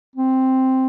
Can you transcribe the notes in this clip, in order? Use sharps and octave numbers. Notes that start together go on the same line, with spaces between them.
C4